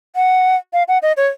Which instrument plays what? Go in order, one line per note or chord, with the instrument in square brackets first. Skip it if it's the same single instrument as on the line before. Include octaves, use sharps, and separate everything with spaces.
[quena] F#5
F5
F#5
D#5
C#5